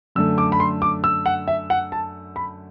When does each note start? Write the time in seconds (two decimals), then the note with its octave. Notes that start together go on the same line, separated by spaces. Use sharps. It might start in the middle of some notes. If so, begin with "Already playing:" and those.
0.15 F#2 D3 A3 E6
0.38 D6
0.52 B5
0.60 C6
0.82 D6
1.04 E6
1.26 F#5
1.48 E5
1.70 F#5
1.92 A5
2.36 B5